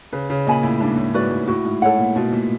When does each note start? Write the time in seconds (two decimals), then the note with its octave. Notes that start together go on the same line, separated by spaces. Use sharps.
0.12 C#3 B4
0.30 C#3
0.46 A#2 D#5 G#5 B5
0.63 A2
0.80 G#2 D4
0.93 A#2
0.97 A2
1.14 G#2 F#4 B4 D5
1.31 G#2
1.48 A2 F#4
1.65 G#2
1.82 A2 A4 C#5 F#5
1.99 A#2
2.16 B2 F4
2.32 A#2